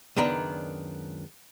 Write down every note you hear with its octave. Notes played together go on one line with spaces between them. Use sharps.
C#2 F#2 D#3 B3 D4 A#5